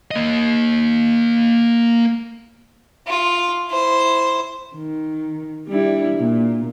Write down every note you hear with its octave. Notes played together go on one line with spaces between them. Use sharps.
A#3 D#5
F4
E4 C5
D#3
G3 D4 E4
A#2